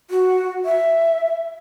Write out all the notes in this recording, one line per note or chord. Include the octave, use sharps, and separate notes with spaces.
F#4
E5